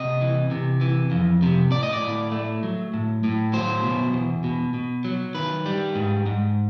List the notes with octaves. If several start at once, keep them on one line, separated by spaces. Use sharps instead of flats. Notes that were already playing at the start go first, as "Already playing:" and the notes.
Already playing: C3 D#5
E3
C3
E3
F2
C3
A2 D5
D#5
D5
A2
A3
F#3
A2
A2
F#3 C5
B2
E2
B2
B2
F#3
D#3 B4
G3
G#2
G#2